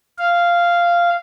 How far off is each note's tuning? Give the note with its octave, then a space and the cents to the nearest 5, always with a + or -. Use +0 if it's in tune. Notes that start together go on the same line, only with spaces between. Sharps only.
F5 -10